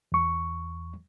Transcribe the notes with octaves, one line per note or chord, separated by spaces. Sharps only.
E2 C#6